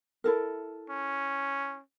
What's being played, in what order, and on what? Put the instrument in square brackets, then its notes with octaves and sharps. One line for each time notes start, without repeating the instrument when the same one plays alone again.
[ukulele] E4 A4 A#4
[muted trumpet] C#4